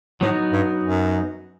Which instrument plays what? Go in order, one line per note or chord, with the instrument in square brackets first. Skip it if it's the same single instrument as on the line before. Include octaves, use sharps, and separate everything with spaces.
[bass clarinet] A2 [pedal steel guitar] F#3 B3 D#4 F#4
[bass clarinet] G2
F#2